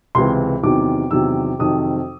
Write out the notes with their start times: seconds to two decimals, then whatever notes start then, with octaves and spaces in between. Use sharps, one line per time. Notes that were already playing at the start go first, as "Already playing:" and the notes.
0.15 C#2 C3 E3 C6
0.63 E2 C3 D#3 F#3 D6
1.11 E2 C3 D#3 F#3 E6
1.59 F2 C3 D#3 F#3 D#6